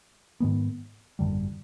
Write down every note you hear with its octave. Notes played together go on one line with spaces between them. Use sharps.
G#2 D#3 G#3 B3
G#1 F#2 D3 G3